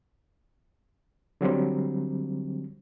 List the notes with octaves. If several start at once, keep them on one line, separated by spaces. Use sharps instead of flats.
D3 F#3 G3 C4